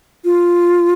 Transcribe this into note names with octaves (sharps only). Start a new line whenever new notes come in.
F4